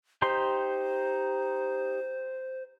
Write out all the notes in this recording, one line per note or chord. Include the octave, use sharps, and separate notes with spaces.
D#4 G4 C5 C6